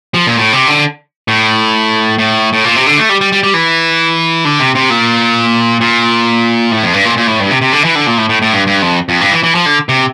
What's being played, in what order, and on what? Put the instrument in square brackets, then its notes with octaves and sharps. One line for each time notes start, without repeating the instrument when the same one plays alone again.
[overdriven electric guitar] F3
A#2
A2
C3
D3
A2
A2
A2
A#2
C3
D3
A3
G3
G3
G3
G3
E3
D3
C3
C3
A#2
A#2
A2
F2
G2
A#2
A#2
A2
G2
C3
C3
D3
E3
D3
A#2
A2
A2
A2
G2
G2
F2
F2
G2
E3
E3
F3
D3
C3